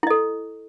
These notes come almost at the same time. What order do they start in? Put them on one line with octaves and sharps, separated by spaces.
E4 D#5 A4